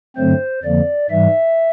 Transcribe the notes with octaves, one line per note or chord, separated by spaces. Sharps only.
G2 D3 F#3 A3 C4 C5
F2 D3 F3 A#3 D5
G#2 E3 G3 E5